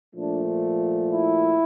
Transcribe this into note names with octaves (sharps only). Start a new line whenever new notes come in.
A#2 F3 A3 D4
E4